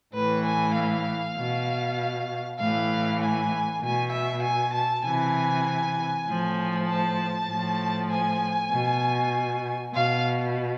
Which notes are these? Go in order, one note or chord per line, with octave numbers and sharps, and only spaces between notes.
A2 E3 B4
G#5
F5
B2
A2 E3 F5
G#5
B2 G#5
E5
G#5
A5
C3 E3 G#5
A2 F3
A5
A2 F3
G#5
B2
B2 F5